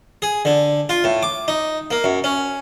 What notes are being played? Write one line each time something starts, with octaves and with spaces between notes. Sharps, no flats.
G#4
D3
F4
A2
D6
D#4
A#3
F#2
C#4